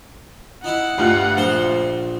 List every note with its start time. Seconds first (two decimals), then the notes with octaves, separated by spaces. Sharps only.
0.64 D#4 E4 F#5
0.98 D2 G2 F4 F#6
1.37 A#1 C5 A#5